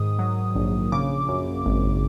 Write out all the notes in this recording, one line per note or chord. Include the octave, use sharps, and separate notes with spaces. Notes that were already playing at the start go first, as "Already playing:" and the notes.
Already playing: G#2 D#3 D#6
F#3
A#1
C#3 D6
F#2
G#1